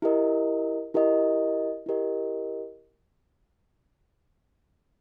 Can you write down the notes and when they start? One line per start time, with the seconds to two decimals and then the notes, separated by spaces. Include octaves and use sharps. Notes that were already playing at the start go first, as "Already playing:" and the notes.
0.02 E4 G4 A#4 D#5
0.94 E4 G4 A#4 D#5
1.86 E4 G4 A#4 D#5